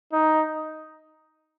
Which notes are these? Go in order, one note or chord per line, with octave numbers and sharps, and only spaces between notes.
D#4